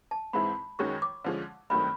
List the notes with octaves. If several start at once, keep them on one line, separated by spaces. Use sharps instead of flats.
A5
G#2 E3 G#3 C4 E4 B5
F#2 D#3 G#3 C#4 F#4 C#6
D6
D3 F3 G#3 C#4
G2 D#3 F#3 A3 C4 B5